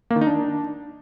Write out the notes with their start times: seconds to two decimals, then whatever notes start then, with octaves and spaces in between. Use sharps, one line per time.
0.10 A#3
0.16 D#3
0.21 D#4
0.27 D4